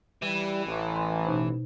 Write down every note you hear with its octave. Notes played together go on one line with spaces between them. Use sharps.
E3 G3
A1
G#5 B5 C6
B2 D#4 C5